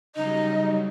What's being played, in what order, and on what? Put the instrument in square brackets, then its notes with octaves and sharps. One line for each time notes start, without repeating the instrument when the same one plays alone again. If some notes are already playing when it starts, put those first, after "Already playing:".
[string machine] C#3 F#3 G3 [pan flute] D#4 [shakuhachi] D#5